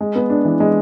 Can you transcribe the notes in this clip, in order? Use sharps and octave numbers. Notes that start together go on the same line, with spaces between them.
G#3
B3
D4
E3
G#3